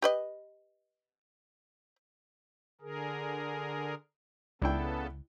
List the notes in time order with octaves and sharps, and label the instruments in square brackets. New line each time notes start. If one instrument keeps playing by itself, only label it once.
[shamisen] G4 B4 D#5
[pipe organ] D3 G#4 A#4
[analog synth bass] C#2 [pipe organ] C#3 B3 A4 [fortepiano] D4 E4 G5